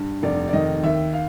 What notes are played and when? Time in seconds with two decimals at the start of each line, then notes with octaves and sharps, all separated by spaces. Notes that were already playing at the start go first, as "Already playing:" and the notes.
Already playing: G2
0.23 F1 D5
0.48 D5
0.53 D#3 D#5
0.84 D#2 E5
1.13 F5